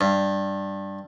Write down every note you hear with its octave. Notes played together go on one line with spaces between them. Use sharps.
G2